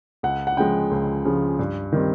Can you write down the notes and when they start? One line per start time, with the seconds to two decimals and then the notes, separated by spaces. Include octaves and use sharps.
0.23 C#2 F#5
0.47 F#5
0.57 C#3 F3 G#3 G5
0.91 C#2
1.25 C#3 F3 G#3
1.59 G2
1.92 D#3 G3 C4